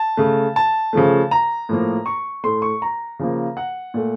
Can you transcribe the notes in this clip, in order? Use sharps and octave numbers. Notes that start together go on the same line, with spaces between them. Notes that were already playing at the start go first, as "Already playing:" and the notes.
Already playing: A5
C#3 A3
A5
C#3 F3 A3
A#5
A2 F3 A#3
C#6
A2 A3 C6
C#6
A#5
C#3 F3 A#3
F#5
A#2 A3